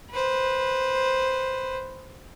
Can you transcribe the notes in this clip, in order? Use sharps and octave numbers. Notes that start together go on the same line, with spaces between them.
B4 C5